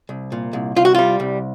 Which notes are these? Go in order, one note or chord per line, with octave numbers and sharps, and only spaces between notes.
C2
A#2
C2
C2 F4
F#4
G3 F4
C2